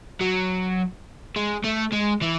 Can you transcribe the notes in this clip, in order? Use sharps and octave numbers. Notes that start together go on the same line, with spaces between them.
F#3
G#3
A3
G#3
E3